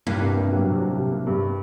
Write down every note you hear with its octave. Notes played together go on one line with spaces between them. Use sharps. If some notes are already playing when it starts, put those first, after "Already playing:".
G2 A#3
C2
A#3
F#3
C3
F#3
C3
A#3
G2